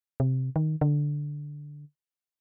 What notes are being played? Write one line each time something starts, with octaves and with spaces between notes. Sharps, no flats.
C3
D#3
D3